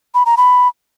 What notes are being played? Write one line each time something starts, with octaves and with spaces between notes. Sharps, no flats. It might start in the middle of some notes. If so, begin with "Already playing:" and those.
B5
A#5
B5